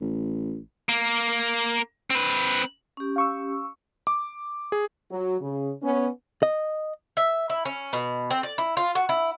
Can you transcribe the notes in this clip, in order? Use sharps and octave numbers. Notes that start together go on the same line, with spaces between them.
A1
A#3
C4 B4
C#4 G4
F5 C#6 E6
D6
G#4
F#3
C#3
B3 C#4
D#5
E5
E4
C#4
B2
C4
D5
E4
F4
F#4
E4